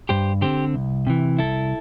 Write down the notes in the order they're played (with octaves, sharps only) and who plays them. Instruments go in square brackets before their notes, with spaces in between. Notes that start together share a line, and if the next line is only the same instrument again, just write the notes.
[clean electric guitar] G2 G4 C5
D3 C4 G4 C5
C2
C3 E3
C2 E4 A4